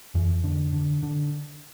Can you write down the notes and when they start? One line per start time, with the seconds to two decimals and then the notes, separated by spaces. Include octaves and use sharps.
0.15 F2 E3
0.44 D3
0.73 D3
1.03 D3